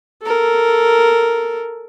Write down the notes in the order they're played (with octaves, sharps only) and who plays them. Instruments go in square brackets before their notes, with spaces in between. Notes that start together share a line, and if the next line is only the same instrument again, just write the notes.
[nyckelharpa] A4 A#4